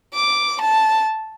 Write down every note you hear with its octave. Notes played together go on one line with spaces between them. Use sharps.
D6
A5